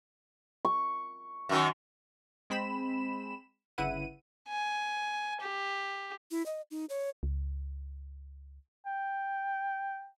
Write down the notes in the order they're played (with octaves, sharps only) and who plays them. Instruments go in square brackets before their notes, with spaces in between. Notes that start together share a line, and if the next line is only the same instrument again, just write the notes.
[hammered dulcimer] C#6
[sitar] F#2 D#3
[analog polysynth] G#3 C4 B5 E7
G1 C#3 E4 B4 F#5 D#7
[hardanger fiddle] G#5
G4
[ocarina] E4
D#5
D#4
C#5
[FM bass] C#2
[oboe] G5